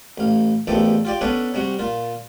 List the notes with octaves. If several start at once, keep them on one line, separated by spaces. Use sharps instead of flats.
A1 F5
A1 E2 D#3 F3 G4 A4
F4 G4 D5
B3 C#4 D4 A4 B4
C3 G3 F#4
A#2 F4